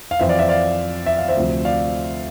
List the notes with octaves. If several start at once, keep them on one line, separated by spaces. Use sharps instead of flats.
F5
F2 E3 C5 E5
D5 F5
C5 E5
D5 F5
E5
F5
C5 E5
D2 C3 F3
D5 F5